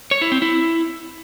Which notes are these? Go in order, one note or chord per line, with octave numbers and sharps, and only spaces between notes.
C#5
E4
C4
E4